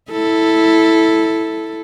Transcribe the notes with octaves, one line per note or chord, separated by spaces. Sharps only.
E4 A4